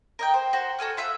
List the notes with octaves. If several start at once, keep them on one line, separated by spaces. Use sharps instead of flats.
A#4 D#5 G5
C5
F#4 C5
F#4 A4 G#5 F6
F4 E5 E6 F#6